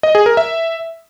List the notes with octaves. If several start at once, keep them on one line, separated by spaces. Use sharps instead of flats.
D#5
G#4
A#4
E5